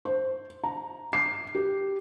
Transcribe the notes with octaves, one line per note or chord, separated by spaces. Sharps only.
C5
A#5
C7
G4